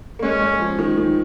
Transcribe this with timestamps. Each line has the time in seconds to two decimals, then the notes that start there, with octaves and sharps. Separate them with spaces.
0.19 A#3
0.23 G#3 C#4
0.42 G#3
0.60 F3
0.79 D#3
0.98 D#3